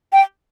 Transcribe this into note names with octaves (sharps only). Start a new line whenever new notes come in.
G5